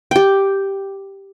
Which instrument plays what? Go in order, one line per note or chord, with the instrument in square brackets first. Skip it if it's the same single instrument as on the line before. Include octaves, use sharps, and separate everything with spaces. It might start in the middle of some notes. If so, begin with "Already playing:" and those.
[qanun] G4 G5